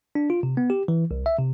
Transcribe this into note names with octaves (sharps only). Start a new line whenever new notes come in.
D4
F4
C3
B3
G4
E3
C2
E5
C3